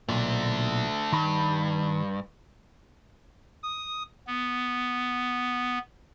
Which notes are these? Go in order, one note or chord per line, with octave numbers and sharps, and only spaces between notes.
B1 A#2 A3 D4
G2 D#3 D#4 B5
D#6
B3